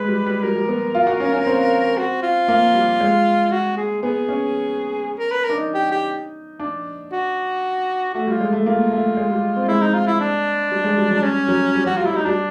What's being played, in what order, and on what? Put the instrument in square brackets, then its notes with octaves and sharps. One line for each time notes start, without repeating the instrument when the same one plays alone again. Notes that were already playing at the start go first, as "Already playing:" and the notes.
Already playing: [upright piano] G#3 [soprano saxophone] B4
[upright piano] G3
G3
[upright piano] G3 [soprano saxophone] A#4
[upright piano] G3
B3
F4
F#4
C#4
C#4
C4
[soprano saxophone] F#4
F4
[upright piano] A#3
G3
G#3
[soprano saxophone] F#4
G#4
[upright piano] B3 [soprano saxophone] G#4
[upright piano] C#4
[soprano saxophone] A#4
B4
[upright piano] D4 [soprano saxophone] A#4
[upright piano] D#4
[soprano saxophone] G4
G4
[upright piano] D4
[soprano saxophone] F#4
[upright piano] A3 [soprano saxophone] F#4
[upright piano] G3 [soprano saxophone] F4
[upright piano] G#3
A3
[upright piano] A#3 [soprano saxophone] F4
[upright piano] A3
G#3
G3
C4
[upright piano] G#3 [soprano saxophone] E4
[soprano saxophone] D#4
F4
E4
D4
[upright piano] G3
G#3
G3
F#3
[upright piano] G3 [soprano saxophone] C#4
[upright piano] F#3
G3
[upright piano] F#3 [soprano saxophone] F#4
[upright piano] G3 [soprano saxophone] F4
[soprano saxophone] E4
[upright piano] G3 [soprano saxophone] D#4
[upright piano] G3 [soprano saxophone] D4